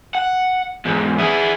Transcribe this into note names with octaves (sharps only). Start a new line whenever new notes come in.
F#5
E2 G#2
E4 G#4